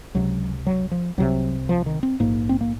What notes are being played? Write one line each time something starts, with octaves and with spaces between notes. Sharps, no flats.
C#2 C3 F#3
F#3
F3
C2 C3 F#3
F3
D#3
C4
A#1 G#2 A#3
C4
A#3